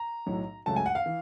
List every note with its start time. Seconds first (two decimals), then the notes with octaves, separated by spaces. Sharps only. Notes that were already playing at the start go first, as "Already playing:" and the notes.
Already playing: A#5
0.26 B1 A2 F#3
0.66 C#2 C#3 F#3 A3 A5
0.76 G#5
0.86 F#5
0.95 F5
1.06 E3